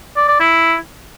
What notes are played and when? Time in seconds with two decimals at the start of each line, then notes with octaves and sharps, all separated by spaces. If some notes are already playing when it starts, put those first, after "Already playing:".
0.16 D5
0.28 D5
0.40 E4